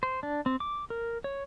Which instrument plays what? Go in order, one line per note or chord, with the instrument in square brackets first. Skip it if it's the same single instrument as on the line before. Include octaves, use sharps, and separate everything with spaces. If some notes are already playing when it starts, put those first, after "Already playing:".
[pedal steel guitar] C5
D4
C4
D6
A#4
C#5